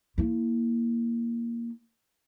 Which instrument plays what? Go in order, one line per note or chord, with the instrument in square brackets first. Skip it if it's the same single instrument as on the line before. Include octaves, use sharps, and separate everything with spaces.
[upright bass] A#3 E4